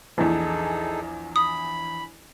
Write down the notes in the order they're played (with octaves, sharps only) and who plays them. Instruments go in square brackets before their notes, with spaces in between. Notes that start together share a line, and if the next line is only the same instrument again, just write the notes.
[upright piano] A#1 E2 [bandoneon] D#4 G#4 A4
[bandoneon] B5 [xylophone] D#6